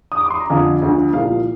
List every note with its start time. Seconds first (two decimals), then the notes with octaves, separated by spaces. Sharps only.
0.12 D#6
0.21 D6
0.31 C6
0.40 A#5
0.50 F2 D3 F3 F5 G#5
0.82 D2 D3 F3
1.13 C2 A#2 F3 F5